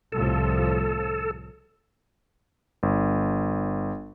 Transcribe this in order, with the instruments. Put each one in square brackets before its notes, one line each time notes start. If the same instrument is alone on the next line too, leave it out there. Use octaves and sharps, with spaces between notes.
[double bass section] C2 A2 F3 [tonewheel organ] A4
[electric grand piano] G1